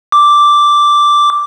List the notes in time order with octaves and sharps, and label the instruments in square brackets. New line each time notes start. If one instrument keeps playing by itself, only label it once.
[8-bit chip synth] D6